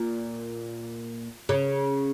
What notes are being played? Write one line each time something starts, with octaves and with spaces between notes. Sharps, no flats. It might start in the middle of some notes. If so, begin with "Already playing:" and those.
Already playing: A#2
C#3